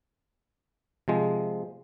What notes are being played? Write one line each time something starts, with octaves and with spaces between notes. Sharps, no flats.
C3 F3 G#3